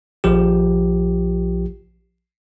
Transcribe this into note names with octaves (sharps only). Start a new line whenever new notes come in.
A#1 F3 G4